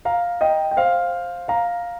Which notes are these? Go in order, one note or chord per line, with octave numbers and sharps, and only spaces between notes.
F5 A#5
D#5 G5
G5
C5 F5
F5 A#5